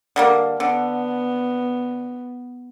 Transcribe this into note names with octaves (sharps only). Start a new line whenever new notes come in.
D3 G3 A#3
D3 B3